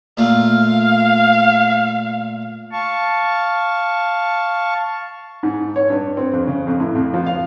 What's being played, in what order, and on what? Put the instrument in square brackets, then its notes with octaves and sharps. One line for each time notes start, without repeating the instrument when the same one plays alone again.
[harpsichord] A#2 A3 [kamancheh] F5
[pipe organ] F5 A5 C#6
[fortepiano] G#2
C#5
G2
C4
F2
C#3
F2
A2
F2
F3
F5